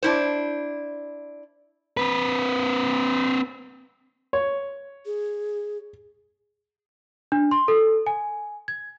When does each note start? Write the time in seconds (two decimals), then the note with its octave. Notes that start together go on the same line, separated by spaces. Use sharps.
0.03 D4 E4 C5
1.97 C4 B4
4.33 C#5
5.06 G#4
7.32 D4
7.51 C6
7.68 A4
8.07 G#5
8.68 G#6